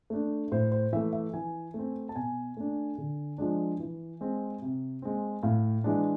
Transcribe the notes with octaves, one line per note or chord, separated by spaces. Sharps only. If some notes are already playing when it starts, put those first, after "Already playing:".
A3 D4
A2 C5
C5
E3 A3 E5
E5
E3 G#5
A3 C4
A5
B2 G#5
A3 D4
D3
F3 G#3 D4
E3
G#3 C4
C3
G#3 C4
A2 F5
E3 G#3 D4